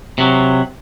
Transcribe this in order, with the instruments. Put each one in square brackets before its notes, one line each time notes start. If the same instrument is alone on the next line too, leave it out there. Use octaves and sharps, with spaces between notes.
[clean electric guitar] C3 F#3